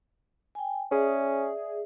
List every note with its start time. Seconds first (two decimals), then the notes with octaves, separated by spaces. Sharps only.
0.55 G5 G#5
0.92 C#4 G#4 D5 E5